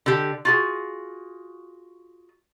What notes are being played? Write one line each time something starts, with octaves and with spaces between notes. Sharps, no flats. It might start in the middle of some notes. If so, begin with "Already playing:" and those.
D3 G4
F4 F#4 G#4